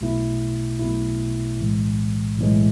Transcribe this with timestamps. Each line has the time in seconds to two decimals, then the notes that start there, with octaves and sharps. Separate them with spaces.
0.01 B1 B2 A3 E4
0.80 B1 B2 A3 E4
1.59 B1 A2 E3 G#3
2.38 B1 A2 E3 G#3